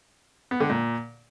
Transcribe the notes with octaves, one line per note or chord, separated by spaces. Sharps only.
B3
D3
A#2